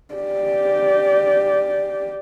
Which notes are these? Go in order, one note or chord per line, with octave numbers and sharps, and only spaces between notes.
G4 D5